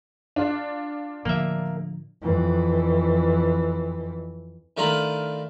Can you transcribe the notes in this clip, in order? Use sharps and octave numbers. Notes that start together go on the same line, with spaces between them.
D4 F4 D5
A2 D3 F3 A#3 E5
F2 E3
D#3 A3 D4 F4 A#5 B5